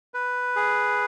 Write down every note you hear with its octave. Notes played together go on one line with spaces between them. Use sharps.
B4
G#4